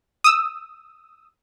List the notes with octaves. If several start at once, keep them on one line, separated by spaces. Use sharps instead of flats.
D#6 E6